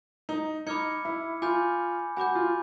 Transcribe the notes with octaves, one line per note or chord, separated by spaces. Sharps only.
D#4
D#4 B5 D6 F6 G#6 C#7
E4
F4 G#5 B5 D6 G6
F#4 G#5 B5 D6 G6
F4